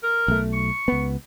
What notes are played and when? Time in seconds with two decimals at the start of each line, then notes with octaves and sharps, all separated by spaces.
0.03 A#4
0.28 B1 A3
0.53 C#6
0.88 C#2 B3